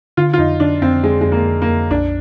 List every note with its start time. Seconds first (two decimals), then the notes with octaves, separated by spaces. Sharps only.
0.17 D3 F4
0.34 F4
0.38 F2 D#4
0.60 D3 D4
0.82 F2 C4
1.03 F2 G#3
1.21 F2 G#3
1.32 A#3
1.47 F2
1.62 A#3
1.68 F2
1.90 A#1 D4